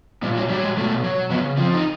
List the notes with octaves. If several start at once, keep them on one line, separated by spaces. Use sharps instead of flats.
A#2 G3
F#3
F#3 G3
G#3
B2 A3
F#3
C#3 B3
F3 C4
D#4